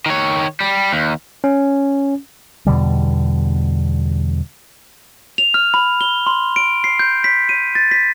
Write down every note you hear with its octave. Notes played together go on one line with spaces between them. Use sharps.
D#3 C#5
G3
D#2
C#4
E2 B2 D3 G3
F7
F6
B5
G7
C6
D7
C7
G6
B6
D#7
A6
B6